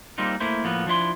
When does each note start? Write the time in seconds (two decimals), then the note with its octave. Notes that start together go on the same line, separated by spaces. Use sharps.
0.18 G3 A#3 C4 D#4 F4
0.40 A3 A#3 E4 C5
0.64 A2 F3 A#3 B3
0.87 F3 D4 E4 C6